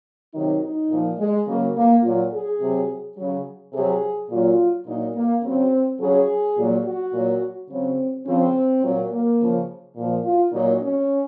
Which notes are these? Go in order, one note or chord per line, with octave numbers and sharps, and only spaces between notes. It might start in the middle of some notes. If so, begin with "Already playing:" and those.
C3 D#3 F#3 D#4
D#4
A#2 F3
G#3
C#3 F#3 A#3
A#3
A#2 F#3 F4
G#4
C3 F#3
C#3 F#3
C3 F#3 G#4
A#2 F#3 F4
A#2 F#3 D#4
A#3
C#3 F#3 C4
C#3 F#3 G#4
A#2 F#3
F#4
A#2 F#3
C#3 F#3 C4
C#3 F3 C4
A#2 F#3
A#3
C#3 F3
A#2 F3
F4
A#2 F#3 D#4
C#4